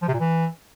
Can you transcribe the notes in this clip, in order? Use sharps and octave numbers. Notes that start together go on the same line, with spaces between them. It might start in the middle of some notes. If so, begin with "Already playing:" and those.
F3
C3
A#2
E3